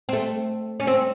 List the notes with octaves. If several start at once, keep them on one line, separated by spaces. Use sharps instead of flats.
C4
A3
C#4
C4